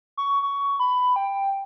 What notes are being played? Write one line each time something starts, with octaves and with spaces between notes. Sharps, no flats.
C#6
C#6
B5
G5